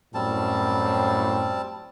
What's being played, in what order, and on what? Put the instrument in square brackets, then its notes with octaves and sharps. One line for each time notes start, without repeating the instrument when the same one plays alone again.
[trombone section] F#2 A2 [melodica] G3 C4 A5